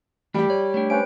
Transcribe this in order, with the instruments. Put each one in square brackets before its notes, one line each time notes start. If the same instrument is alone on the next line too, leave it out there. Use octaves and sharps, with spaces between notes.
[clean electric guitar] E3 A3 G5 [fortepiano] G3 G4
[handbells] C#5 [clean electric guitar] D5
[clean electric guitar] A3 D4 [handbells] C#5 G5
[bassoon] C#4 [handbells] B4 C5 D7